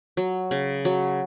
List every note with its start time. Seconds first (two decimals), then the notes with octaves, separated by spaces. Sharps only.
0.17 F#3
0.51 C#3
0.85 F#3